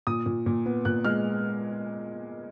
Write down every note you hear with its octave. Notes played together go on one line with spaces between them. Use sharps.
A#2 D#6
A#2
A#2
B3
A#2 F#6
G#3 F6